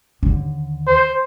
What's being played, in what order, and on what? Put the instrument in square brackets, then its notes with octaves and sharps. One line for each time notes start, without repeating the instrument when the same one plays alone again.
[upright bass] D#2 D3
[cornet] C5